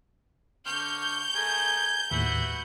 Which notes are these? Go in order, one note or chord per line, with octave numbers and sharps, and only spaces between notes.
D3 C#6 F6 G6
A3 G#4 A#4 G#5
D#2 A2 F#4 B4 E5 F#5